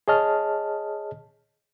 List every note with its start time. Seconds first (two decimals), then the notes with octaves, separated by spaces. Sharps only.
0.08 G#4 C#5 D#5 A5 F6